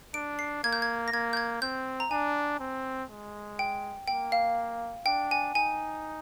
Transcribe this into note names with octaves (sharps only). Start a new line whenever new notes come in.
D4 D7
C7
A#3 G#6
G6
G#6
A#6
A#3 G#6
G6
G#6
C4 G6
A#5
D4 G#5
C4
G#3
G5
A#3 G5
F5
D4 G5
G#5
D#4 G#5